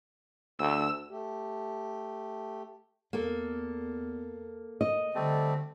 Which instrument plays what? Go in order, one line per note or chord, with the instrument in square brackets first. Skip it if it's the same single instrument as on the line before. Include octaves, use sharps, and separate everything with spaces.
[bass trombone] D2 [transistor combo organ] E6
[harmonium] A3 G4
[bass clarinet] E2 [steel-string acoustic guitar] A#3 A4
[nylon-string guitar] D#5
[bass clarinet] D3 [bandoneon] G3 A3 C4